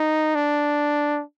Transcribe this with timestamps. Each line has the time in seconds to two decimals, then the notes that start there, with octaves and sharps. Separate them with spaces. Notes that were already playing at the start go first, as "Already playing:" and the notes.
Already playing: D#4
0.35 D4